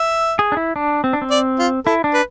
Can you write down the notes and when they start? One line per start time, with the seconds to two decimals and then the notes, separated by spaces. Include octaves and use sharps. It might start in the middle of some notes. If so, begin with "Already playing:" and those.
Already playing: E5
0.39 G#4
0.52 D4
0.57 E4
0.76 D4
1.04 C4
1.13 D4
1.22 C4
1.31 D5
1.59 F4
1.85 E4 A4
2.04 D4
2.14 B4